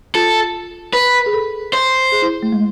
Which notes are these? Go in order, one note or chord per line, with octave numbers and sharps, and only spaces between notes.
F4 A4
B4
G#4
A4
C5
G#4
E4
A3
G#3